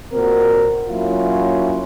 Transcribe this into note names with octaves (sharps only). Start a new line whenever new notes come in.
A#2 C4 F#4 A#4
F#3 A#3 C#4 E4 F4